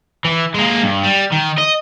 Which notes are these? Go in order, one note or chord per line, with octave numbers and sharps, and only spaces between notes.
E3
G#3 A#3
G2
G3
D#3
D#5